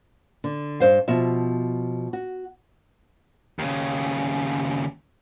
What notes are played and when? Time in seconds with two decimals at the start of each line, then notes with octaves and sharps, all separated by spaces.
0.44 D3
0.80 G2 C5 F5
1.08 B2 F3 E5
2.13 F#4
3.59 D#2 C#3